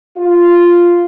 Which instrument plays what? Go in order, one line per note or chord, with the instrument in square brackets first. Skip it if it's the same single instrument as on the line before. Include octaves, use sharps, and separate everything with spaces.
[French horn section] F4